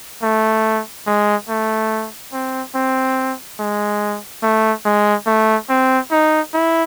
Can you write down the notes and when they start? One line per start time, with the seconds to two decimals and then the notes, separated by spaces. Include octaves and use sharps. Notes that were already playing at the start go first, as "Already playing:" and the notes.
0.23 A3
1.06 G#3
1.49 A3
2.33 C4
2.75 C4
3.59 G#3
4.43 A3
4.85 G#3
5.26 A3
5.69 C4
6.11 D#4
6.54 E4